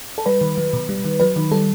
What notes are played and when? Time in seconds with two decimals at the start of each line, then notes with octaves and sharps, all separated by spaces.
0.18 A4
0.26 G3 B4
0.41 D#3
0.57 F#3
0.73 B2
0.89 G3
1.05 D#3
1.20 F#3 B4
1.36 D#3
1.52 G3 A4